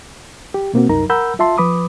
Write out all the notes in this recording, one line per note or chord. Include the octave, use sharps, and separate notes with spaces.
G4
B2 A#3 C4 F#4
C2 F#2 D#4 A#4 A#5
A#4 F#5 A#5 B5 E6 G6
F4 E5 A5 C6
F3 B4 B5 D6 D#6